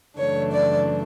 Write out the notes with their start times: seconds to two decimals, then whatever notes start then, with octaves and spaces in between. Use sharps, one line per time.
0.19 F#2 C#3 E3 A3 D4 C#5
0.52 D5